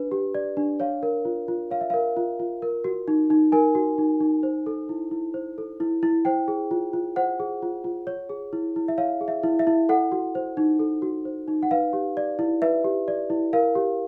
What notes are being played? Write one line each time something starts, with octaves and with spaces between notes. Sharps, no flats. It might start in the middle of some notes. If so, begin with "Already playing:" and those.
Already playing: D4 B4
G4
D5
D4
C#5 F5
A#4
F4
F4
C#5 F5
E5
A#4 F5
F4
F4
A#4
F#4
D#4
D#4
A#4 G#5
F#4
D#4
D#4
C5
A4
E4
E4
C5
A4
E4
E4
C5 G5
G#4
F4
F4
C5 F#5
G#4
F4
F4
C#5
G#4
E4
E4
E5
C#5 F5
G#4
E5
E4
E5
E4
A4 F#5
F#4
C5
D#4
A4
F#4
C5
D#4
F#5
B4 F5
G4
D5
E4
B4 E5
G4
D5
E4
A#4 F5
G4